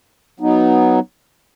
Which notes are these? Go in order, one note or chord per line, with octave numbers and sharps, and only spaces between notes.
F#3 B3 D#4